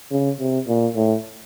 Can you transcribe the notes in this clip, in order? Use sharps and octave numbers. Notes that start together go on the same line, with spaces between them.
C#3
C3
A#2
A2